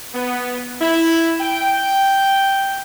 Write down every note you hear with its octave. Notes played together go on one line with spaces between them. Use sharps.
B3
E4
G5